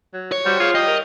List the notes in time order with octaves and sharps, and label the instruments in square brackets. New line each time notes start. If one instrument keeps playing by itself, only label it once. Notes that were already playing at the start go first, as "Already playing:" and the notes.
[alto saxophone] F#3
[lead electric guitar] C#5
[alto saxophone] G3 [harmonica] F#4 C5 G5
[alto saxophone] F4 [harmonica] G#4 C5 F5
[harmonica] G3 G5 D#6 [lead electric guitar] D#5
[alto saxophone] A#4